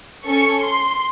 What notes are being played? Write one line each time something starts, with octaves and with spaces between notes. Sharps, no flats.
C#4 A4 C#6
C6